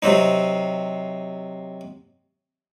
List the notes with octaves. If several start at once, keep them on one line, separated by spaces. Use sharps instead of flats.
C3 F#3 C4 D#4